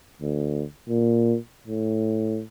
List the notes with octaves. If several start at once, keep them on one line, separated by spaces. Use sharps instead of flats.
D2
A#2
A2